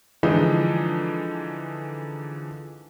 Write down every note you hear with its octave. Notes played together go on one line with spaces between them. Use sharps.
D3 E3 F3 G#3 D#4